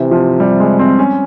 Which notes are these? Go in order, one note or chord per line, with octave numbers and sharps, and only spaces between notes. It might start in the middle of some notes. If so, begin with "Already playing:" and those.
Already playing: C3 E3
F3
G3
G#3
C4
C#4